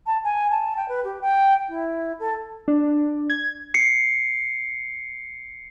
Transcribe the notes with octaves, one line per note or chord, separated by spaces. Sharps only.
A5
G#5
A5
G5
B4
G4
G5
E4
A4
D4
G#6
C7 C#7